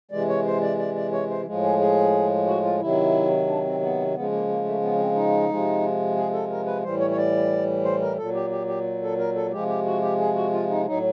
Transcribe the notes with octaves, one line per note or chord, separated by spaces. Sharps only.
C3 E3 G#3 D5
C#5
C5
D5
D5
D5
C#5
C5
A2 F3 G#3
G#4
G#4
F#4
F4
C3 D#3 F#3 E4
D4
C4
B3
C#3 F3 G#3 B3
A#3
A#3
A3
B3
C#4
C4
D#4
C3 F3 G#3
G#4
A4
A#4
B4
A2 E3 G3 C5
C#5
C#5
D5
C5
A#4
A#2 F#3 A4
G4
G4
G4
A4
A#4
A4
C3 F3 G#3 G4
G4
F#4
G4
G#4
F#4
F4
D#4
A2 F#3 D#4